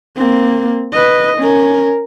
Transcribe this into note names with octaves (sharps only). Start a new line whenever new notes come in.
A#3 C4
B4 D#5
C#4 A#4